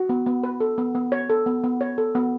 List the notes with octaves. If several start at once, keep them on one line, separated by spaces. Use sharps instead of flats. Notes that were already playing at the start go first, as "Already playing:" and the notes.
Already playing: F#4
B3
B3
B4
A4
B3
B3
C#5
A4
B3
B3
C#5
A4
B3